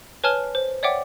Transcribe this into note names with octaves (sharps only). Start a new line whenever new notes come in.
B4 C#5 G#5 A5 F6 G7
C5
C#5 D5 E5 F#5 G5 D6